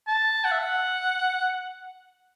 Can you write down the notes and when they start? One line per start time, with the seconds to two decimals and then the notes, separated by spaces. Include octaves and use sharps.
0.07 A5
0.44 F#5
0.51 E5
0.59 F#5